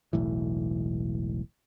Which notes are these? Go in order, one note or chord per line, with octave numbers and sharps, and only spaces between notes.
E1 B1 A2 E3